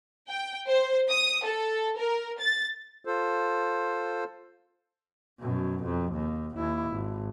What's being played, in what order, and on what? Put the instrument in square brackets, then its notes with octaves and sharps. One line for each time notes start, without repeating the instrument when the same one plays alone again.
[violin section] G5
C5
D#6
A4
A#4
A6
[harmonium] F4 A4 C5
[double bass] F#2 B2
F2
D#2
D#2 E4
G#1